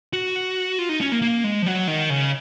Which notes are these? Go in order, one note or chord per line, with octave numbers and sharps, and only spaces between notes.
F#4
F4
D#4
C#4
A#3
A#3
G#3
F3
F#3
D#3
C#3